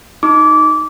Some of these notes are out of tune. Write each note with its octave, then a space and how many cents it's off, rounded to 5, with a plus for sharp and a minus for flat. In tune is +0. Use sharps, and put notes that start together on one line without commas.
D#4 +0 D6 -20